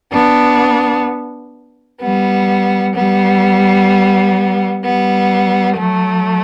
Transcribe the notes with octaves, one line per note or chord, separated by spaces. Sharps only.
B3 D4
G3 B3
G3 B3
G3 B3
F#3 A3